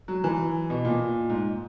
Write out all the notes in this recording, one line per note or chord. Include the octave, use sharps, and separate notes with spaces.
F#3
E3
B2
A#2
G#2